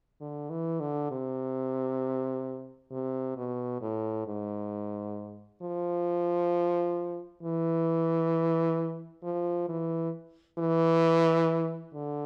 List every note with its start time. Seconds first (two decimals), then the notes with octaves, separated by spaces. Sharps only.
0.20 D3
0.50 E3
0.80 D3
1.11 C3
2.91 C3
3.36 B2
3.81 A2
4.26 G#2
5.62 F3
7.43 E3
9.23 F3
9.69 E3
10.59 E3
11.94 D3